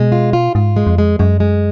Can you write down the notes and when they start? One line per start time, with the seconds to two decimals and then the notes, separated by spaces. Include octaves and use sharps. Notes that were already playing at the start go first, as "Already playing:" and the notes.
Already playing: B2 G#3
0.12 F4
0.33 F4
0.55 G#2 F4
0.76 G#3
0.87 F2
0.98 G#3
1.19 F#2 G#3
1.40 G#3